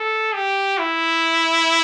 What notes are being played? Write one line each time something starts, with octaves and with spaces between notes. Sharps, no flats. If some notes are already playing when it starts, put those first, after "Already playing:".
Already playing: A4
G4
E4